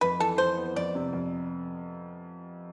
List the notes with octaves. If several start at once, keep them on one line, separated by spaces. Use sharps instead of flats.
F2 B4
E3 A4
F2 C5
B3
F2 D5
C3
F2